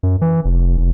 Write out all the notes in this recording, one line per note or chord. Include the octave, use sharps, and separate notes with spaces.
F#2
E3
F1
F1